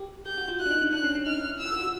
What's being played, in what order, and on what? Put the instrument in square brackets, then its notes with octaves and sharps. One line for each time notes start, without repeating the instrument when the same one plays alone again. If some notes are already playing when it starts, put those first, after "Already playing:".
Already playing: [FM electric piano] G4
[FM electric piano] G4 [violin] G6
[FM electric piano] F#4
F4
[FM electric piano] E4 [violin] F#6
[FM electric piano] D4
D#4
D4
[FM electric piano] D4 [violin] F#6
[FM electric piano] C#4
C#4
[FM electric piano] D#4 [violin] F6
[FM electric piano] E4
[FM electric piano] F4 [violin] E6
[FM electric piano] F#4
F#4